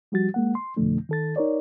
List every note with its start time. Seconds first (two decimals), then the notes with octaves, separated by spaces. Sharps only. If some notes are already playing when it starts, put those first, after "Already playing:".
0.12 F3 G3 F#4 A6
0.34 G#3 A#3 F#5
0.55 C6
0.77 F2 B2 D3 F3 A3 D4
1.09 D#3 A4 A6
1.36 D#4 A#4 C#5 D5